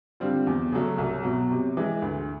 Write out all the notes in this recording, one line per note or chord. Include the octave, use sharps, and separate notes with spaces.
D3 G3 C4 F4
E2
C#3 F#3 A3
C2
B2 F#3
C3
E3 G#3
D2